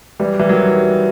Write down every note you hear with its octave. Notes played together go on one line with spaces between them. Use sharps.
E3 G3
E3 G3
D#3 F#3